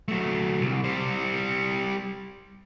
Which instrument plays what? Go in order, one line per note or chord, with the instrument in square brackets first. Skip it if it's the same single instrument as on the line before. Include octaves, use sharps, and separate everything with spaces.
[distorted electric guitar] F#3 A3
C2
G3 C5